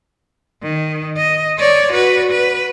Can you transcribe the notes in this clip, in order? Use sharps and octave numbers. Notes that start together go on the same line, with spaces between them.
D#3
D#5
C#5 D5
F#4 B4
B4